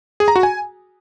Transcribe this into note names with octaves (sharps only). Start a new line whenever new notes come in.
G#4
A#5
F#4
G#5